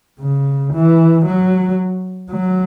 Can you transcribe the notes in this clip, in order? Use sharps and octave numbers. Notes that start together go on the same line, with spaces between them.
C#3
E3
F#3
F#3